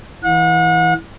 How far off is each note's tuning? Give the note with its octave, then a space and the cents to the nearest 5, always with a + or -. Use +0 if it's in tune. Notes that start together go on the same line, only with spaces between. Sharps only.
E3 -15 F#5 -40